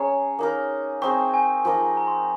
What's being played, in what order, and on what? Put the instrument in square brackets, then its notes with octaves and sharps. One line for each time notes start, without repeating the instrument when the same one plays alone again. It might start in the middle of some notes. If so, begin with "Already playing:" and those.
Already playing: [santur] C#4 G#4 C#5 [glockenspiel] A#5
[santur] A#3 D#4 A#4
[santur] C4 D#4 G#4 [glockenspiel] C#6
[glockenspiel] G#5
[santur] F3 A#3 D#4
[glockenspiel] A#5
C6